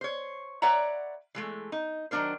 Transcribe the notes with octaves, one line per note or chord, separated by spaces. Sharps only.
C5 C#5
B4 C#5 D5 E5 F#5 A#5
E3 G#3 A3
D#4
D#3 F#3 C#4 D4 A#4 C5